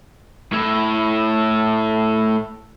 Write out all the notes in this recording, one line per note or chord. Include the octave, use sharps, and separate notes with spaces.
A2 E4